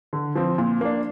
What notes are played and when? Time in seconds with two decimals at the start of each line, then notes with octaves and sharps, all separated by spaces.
0.13 D3
0.35 F3 C4
0.58 A#2
0.81 A#3 D4